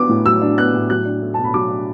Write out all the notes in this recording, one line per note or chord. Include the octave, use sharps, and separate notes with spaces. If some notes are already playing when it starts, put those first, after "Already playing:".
Already playing: F#3 B3 D4 D6
A2
F#3 E6
D4
B3 F#6
A2
F#3 F#6
D4
A3
B2 A5
B5
F#3 D6
D4